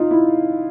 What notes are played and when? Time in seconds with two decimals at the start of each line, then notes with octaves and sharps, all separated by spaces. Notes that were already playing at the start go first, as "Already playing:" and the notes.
Already playing: D#4 F4
0.11 E4